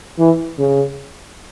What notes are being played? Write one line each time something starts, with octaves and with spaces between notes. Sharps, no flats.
E3
C#3